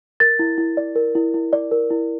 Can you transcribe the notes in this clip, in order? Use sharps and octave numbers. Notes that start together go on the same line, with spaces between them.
A#4 A6
E4
E4
D5
A#4
E4
E4
D5
A#4
E4